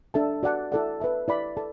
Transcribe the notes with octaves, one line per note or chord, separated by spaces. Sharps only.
D4 A4 E5 A5
F#4 D5 F#5 A5
E4 A4 D5 F#5
B4 E5 A5
E4 D5 B5
A4 D5 A5